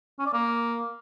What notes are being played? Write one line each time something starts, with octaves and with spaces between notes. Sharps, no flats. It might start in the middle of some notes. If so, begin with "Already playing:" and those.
C#4
D5
A#3